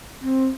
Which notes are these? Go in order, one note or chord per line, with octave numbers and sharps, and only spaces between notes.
C4